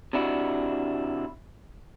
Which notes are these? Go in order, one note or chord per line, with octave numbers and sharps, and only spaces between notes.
C3 D4 E4 F#4